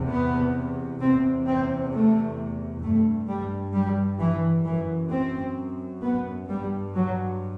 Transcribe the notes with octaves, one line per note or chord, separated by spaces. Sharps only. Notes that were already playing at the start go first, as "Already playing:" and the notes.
Already playing: E2 C3
B3
E2 C3 C4
C4
A3
G2 A3
G3
G3
E3
F#2 E3
C4
B3
G2 G3
F#3